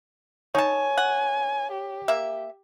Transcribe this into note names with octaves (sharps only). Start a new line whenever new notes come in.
D#4 C#5 G#5 A5
F#5
G4
A#3 E5